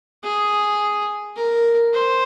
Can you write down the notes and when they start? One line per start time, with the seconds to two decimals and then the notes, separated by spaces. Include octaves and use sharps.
0.23 G#4
1.36 A#4
1.93 C5